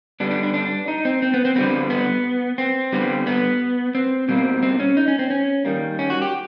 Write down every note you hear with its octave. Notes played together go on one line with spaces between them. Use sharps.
D3 G3 B3 D4
D4
D4
D4
D#4
C4
C4
B3
C4
D3 G3 B3 C4
B3
C4
D3 G3 B3
B3
C4
B2 G3 A#3 C4
C4
C#4
D#4
C#4
C4
C#4
D#3 G3 A#3
C#4
F#4
G4